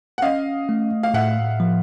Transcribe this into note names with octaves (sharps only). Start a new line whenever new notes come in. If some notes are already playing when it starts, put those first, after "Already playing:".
F#5
C#4 D#5 F5
A3
F5
A2 E5 F#5
F3